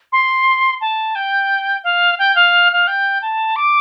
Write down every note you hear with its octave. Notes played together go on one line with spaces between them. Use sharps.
C6
A5
G5
F5
G5
F5
F5
G5
A5
D6